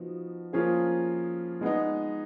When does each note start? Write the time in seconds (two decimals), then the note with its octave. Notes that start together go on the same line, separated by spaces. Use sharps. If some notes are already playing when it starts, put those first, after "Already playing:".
Already playing: F3 B3 D#4 F#4
0.53 F3 A#3 C#4 F4 G#4
1.61 G#3 B3 D#4